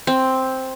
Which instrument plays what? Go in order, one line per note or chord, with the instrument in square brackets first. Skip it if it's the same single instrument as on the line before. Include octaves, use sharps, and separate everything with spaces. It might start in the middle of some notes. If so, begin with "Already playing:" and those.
[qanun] C4